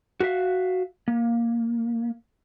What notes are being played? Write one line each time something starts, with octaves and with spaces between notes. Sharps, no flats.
F#4 G4 B4 E5 F5
A#3